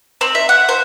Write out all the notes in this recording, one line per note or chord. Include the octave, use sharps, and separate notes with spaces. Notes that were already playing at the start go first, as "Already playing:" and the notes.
C4
E5
F#5
C5